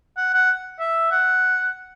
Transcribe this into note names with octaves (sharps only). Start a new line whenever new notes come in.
F#5
F#5
E5
F#5